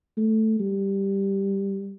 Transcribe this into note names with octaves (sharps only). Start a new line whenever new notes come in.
A3
G3